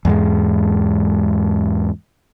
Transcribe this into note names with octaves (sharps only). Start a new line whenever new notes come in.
E2 G#2 G#3